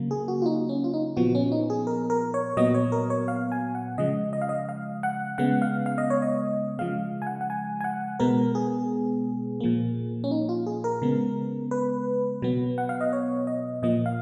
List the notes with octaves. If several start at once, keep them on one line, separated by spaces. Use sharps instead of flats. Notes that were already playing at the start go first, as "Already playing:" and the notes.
Already playing: C#3 F#3 A#3
G#4
F#4
F4
D#4
C#4
F4
D#4
A#2 F3 B3 F#4
C#4
D#4
G#4
A#4
A#4
C#5
A#2 F#3 B3 D#5
C#5
A#4
C#5
F5
G#5
F#5
C#3 F3 G#3 D#5
D#5
F5
D#5
F5
F#5
C#3 G#3 B3 F#5
F5
F5
D#5
C#5
D#5
C#3 F3 G#3 F5
G#5
F#5
F#5
G#5
G#5
F#5
B2 G#3 B3 A#4
G#4
A#2 F3 A#3
C#4
D#4
F4
G#4
A#4
C#3 G#3 B3
B4
B2 F#3 B3
F#5
F5
D#5
C#5
D#5
A#2 F3 A#3 D#5
F5